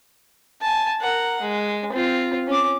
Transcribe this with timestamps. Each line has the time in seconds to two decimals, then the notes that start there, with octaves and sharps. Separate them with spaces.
0.61 G#5 A5
1.00 A#4 F#5
1.42 G#3
1.92 C4 F4
2.47 C#4 D6